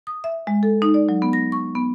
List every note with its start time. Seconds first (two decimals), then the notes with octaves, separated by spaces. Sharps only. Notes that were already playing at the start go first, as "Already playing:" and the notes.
0.07 D#6
0.24 E5
0.47 G#3
0.63 A4
0.82 D#4
0.94 D5
1.09 F#3
1.22 B3
1.33 A#6
1.52 C#6
1.75 B3